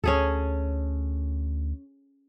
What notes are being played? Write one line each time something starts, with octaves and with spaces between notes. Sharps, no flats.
D2 C#4 G#4 A4